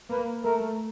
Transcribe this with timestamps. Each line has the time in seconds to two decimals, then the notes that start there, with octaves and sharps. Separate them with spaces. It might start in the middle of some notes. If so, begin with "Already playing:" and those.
0.11 A#3 B4
0.44 A3 A#4